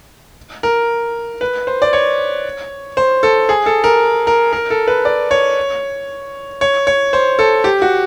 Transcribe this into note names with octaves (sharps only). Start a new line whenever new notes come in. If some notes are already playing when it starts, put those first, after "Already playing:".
A#4
B4
C5
D5
C#5
C5
A4
G#4
A4
A#4
A#4
A#4
A4
B4
D5
C#5
C#5
C#5
C5
A4
G4
F#4